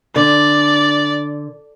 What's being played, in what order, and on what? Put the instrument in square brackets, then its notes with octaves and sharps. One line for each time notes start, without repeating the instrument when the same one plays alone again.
[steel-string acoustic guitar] D3 [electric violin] D5